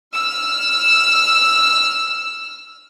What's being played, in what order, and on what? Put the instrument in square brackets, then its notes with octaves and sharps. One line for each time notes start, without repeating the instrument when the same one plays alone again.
[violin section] E6 F6